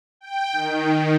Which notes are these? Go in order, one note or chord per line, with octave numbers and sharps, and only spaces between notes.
G5
D#3